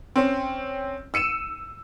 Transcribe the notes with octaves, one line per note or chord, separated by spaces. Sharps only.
C4 C#4
E6 C#7 D#7 E7